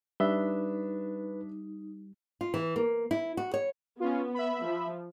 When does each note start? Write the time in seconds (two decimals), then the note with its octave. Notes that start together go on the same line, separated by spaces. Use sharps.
0.20 G3 D4 D#4 B4 E5
2.41 F4
2.54 E3
2.76 A#3
3.11 E4
3.37 F#4
3.54 C#5
4.00 B3 C#4 F4
4.34 E5 B5
4.65 F3